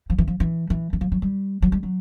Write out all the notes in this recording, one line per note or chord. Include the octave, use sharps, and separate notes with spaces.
F3
E3
F3
E3
E3
E3
F3
F#3
G3
F#3
G3
F#3